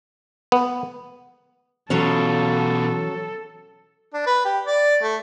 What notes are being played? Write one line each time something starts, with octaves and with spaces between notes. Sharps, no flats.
B3
B2 E3 F#3 C#4 F4 A4
D4
B4
G4
D5
A3